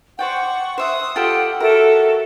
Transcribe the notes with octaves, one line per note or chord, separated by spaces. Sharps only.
C5 D5 F#5 G5 C#6
C5 E5 F#5 D#6
F4 G4 A4 F#5 G5
F#4 A4 A#4 E5